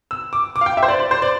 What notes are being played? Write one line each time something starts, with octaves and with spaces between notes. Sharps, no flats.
E6
D6
D6
F5
G5
E5
C5
D5
D5
C5
D5